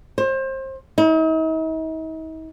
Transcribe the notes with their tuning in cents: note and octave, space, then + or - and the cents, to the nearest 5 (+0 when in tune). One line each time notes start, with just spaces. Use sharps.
C5 +30
D#4 +45